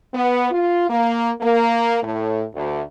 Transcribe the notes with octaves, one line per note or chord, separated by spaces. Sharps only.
B3
F4
A#3
A#3
A2
D2